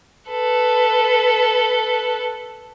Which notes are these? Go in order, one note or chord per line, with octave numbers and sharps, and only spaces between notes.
A4 B4